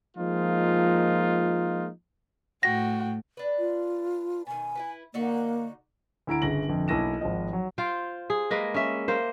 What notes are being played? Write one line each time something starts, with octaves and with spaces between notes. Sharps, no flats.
F3 G#3 A#3 D#4 F4
A2 F#4 G5 A#6
D4 B4
F4
B2 D#3 G#5
E4 G4 B4
D3 A#3 D#4 F#4
D2 E4 A#5 D7
G1 C#3 A#6 F#7
G1 F2
B1 A#3 E4 A#6 D#7 E7
G#1 G#2 F3 D#5
F#3
F4 C5 G5
G#4
G#3 A#3 B4
C#4 E5
A#3 C5